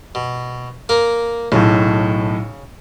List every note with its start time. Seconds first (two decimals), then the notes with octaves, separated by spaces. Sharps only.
0.15 B2
0.89 A#3 A#4
1.52 B1 A2 C#3